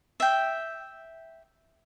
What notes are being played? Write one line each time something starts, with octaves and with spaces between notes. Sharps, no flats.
E5 G5